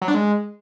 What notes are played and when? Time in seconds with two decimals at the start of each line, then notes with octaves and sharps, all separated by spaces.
0.02 F#3
0.08 D4
0.14 G#3